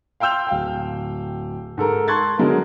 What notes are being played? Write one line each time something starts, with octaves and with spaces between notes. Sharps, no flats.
F5 G5 C6 E6 G6 F7
D1 F5 G5
G#2 A4 A#4
A5 C6 C#6 F#6 G#6 A6
D3 F#3 G#3 D#4 F#4 A#4